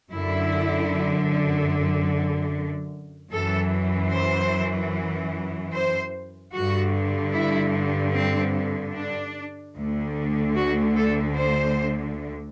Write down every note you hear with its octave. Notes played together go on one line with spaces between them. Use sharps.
F#2 D3 E4
F#2 E3 A4
C5
C5
G2 D3 F#4
E4
C4
D4
D2 D3
F#4
A4
C5